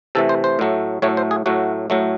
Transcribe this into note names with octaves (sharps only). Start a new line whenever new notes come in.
C3 E3 A3 A4
C5
C5
A2 F#3 A3
A2 F#3 A3 C#5
C5
G#4
A2 F#3 A3 F#4
A2 F#3 A3